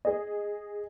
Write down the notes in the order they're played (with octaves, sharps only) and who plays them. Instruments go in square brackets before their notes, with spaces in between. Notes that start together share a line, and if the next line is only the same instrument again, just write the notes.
[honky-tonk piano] G#4 D#5